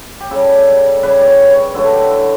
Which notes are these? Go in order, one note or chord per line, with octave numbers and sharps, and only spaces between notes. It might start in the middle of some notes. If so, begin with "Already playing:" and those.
G4
C#3 G3 A4
C#3 G3 B4
D5
C#5
C#5
D3 F#3 A3 A4
G4
E4